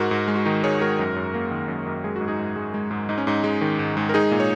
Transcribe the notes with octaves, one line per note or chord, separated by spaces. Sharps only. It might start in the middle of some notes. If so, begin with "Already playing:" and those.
Already playing: G#2 F#4 A#4
G#2
G#3
F#4
D#3 D#4
G#2 G#4 C#5
G#2 F#4 A#4
F#2
F#2
A#3
D#3
F#2
F#2
G#3 G#4
F#4
G#2
D#4 G#4
G#2
G#3
G#3
G#2
G#2 D#4
C#4
G#2 D#4
G#3
D#3
G#2
G#2
A#4
G#3 D#4 G#4
A#2
C#5